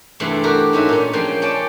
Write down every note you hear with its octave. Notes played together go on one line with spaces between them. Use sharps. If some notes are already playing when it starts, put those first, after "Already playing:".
E2 G2 C3 A3 E4 C6
D4 F#4 G4 A#4
G#2 C#4 D#4 F#4 E5
A#2 G3 C#4
A#2 C#3 F3 G5 C6
C#4 D5 G5 A5